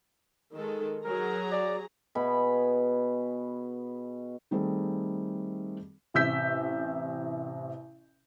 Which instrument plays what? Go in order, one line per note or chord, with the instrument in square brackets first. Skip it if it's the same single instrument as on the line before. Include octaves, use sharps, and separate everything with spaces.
[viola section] D#3 G#3 A4
[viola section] F#3 G#4 A#5 [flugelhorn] A#4
[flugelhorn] D5
[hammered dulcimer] B2 G#4 B5
[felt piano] D#3 G3 A3 C4 G#4 A4
A1 C3 E6 G6 B6